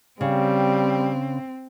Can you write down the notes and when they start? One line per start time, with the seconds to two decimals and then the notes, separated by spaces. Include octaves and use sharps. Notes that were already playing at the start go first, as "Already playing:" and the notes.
0.21 C#3 G3 C4